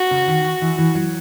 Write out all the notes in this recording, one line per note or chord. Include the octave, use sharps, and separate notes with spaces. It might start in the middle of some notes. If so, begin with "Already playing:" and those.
Already playing: F#4
C#3
D#3
E3
E3
F#3